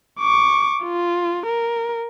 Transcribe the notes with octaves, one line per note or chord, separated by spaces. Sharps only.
C#6 D6
F4
A#4